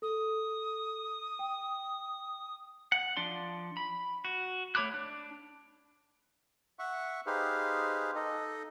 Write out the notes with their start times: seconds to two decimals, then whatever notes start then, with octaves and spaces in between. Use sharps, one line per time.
0.02 A4 D#6
1.39 G5
2.92 F#5
3.17 F3 D4 D5 C6
3.77 B5
4.25 F#4
4.75 A3 C#5 B5 D6 F#6
4.94 D4
6.79 E5 F#5 C#6
7.27 D#4 G4 G#4 B4 C5 F5
8.15 D#4 A4 D#5